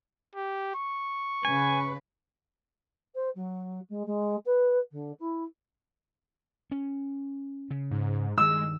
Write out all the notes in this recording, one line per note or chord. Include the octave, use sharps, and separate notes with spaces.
G4
C#6
C#3 B4 G#5
C5
F#3
G#3
G#3
B4
D3
E4
C#4
C#3
G#2
G2 D#3 G#3 E6